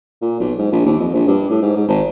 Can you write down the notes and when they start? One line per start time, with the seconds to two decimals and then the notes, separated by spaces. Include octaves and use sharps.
0.22 A#2
0.40 B1
0.59 G#2
0.72 A#1
0.86 D#2
1.00 F2
1.14 A#1
1.27 G2
1.50 A2
1.62 G#2
1.76 G#2
1.88 G#1